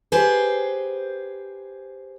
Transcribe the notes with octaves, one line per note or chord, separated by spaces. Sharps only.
G4 G#4 B4 C5